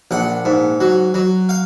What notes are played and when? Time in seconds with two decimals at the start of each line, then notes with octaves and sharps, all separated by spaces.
0.11 A#1 F#5
0.45 G#2
0.80 F#3
1.14 F#3
1.49 F5